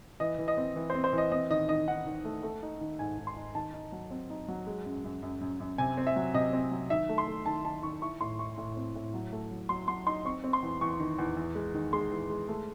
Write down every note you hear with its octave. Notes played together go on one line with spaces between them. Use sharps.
E3 D#5
E3
D#5
C4
E3
C4 C5
C5
E3 D#5
C4 D#5
D#3 D#5
D#3 D#5
D#3 F#5
D#3
A3
A3
D#4
D#3
G#2 G#5
G#2
C6
D#4
D#3 A5
D#4
F#3
C4
D#4
F#3
G#3
F#2
F#2
F#2
F#2
F#2
C3 G#5
C4
E5
F#3
C3 D#5
C4
F#3
D#3 E5
A3
C6
A3
D#3 A5
D#3 A5
D#3 C#6
E4 C#6
A2 C6
E4 C#6
A2
C4
A2
F#3
A3
F#3
F#3 C6
F#3 C6
D#4 C6
C4 C#6
C4
C6
E2
E2 C#6
D#3
E2
E2
G#3
D#3
G#3 C6
E2
G#3
A3